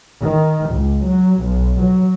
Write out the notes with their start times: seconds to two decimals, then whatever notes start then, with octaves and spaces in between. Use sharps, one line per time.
0.23 D#3
0.71 C#2
1.07 F#3
1.44 B1
1.81 F#3